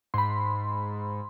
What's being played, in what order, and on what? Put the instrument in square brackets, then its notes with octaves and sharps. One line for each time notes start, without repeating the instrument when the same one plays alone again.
[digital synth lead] G#2 [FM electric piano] B5 C6